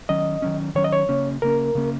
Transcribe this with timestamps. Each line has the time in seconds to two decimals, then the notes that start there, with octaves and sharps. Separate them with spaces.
0.09 D#3 F#3 C#4 D#5
0.42 D#3 F#3 C#4
0.75 D#3 F#3 C#4 C#5
0.84 D#5
0.93 C#5
1.09 C#3 A#3 C#4
1.42 C#3 A#3 C#4 A#4
1.75 C#3 A#3 C#4